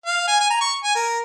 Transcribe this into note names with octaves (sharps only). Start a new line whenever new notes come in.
F5
G#5
G#5
A#5
C#6
G#5
A#4